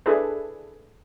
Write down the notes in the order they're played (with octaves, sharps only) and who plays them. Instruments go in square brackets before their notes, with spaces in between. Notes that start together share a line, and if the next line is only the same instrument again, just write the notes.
[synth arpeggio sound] D4 E4 G#4 A4 B4